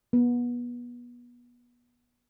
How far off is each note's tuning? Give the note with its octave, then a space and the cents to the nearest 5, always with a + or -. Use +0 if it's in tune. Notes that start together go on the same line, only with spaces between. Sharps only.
B3 -30